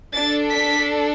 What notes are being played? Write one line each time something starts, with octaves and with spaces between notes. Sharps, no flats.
D4 A4 A6
B6